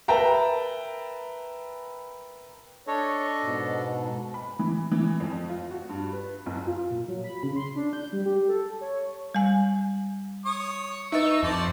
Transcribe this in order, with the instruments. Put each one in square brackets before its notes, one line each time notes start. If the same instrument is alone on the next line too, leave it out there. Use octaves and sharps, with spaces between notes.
[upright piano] A#4 B4 E5 G5 A5 A#5
[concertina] D4 A4 D#5 [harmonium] C#5
[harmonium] G#2 B2
[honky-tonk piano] B5
E3
E3
F2
F4
F#4
G2
B4
F#1
[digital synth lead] F4
A#2
F#3
B5
C#3
C6
D4
G6
G3
G4
A4
C#5
[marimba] G3 G#5
[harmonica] C#5 C#6 D#6
[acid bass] D#4 [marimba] B4 D#5 E5 [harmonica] C#6 E6
[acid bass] F2 [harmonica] C5 D5 A5